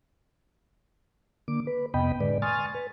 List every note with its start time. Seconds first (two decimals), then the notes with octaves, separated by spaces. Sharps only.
1.48 D3 A#3 D6
1.67 B4
1.94 F2 C3 B3 D#5 G5 B5
2.20 A2 D3 G#3 B4 D5
2.42 G#5 C6 C#6 D#6 F6 A6
2.74 B4